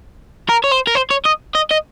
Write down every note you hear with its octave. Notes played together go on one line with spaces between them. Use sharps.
A#4
C#5
C5
A#4
C5
C#5
D#5
D#5
D#5